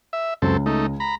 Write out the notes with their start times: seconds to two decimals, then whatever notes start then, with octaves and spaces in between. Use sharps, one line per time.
0.13 E5
0.42 C#2 F#2 C4 A4
0.66 A3 D#4
1.00 A#5 B5